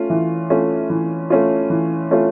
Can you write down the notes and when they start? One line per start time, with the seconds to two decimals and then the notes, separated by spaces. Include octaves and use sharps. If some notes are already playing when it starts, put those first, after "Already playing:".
Already playing: A3 C#4 F4
0.10 E3
0.50 A3 C#4 F4
0.90 E3
1.30 A3 C#4 F4
1.70 E3
2.11 A3 C#4 F4